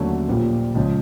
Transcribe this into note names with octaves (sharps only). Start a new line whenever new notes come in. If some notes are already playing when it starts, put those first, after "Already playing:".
Already playing: D#2 D3 F#3 A3 C#4
A#1 A#2 G3
C#2 C#3 F3